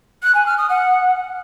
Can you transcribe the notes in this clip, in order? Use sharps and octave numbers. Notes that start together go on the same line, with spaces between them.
F#6
G#5
F6
D#6
F#5